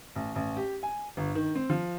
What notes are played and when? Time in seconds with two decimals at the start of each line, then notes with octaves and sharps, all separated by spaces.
0.16 A1
0.36 A1
0.57 G4
0.83 G#5
1.17 G1
1.35 D#3
1.55 C4
1.70 F3